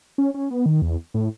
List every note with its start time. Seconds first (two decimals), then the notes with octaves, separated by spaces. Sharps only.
0.18 C#4
0.34 C#4
0.51 B3
0.66 D#3
0.82 E2
1.14 A2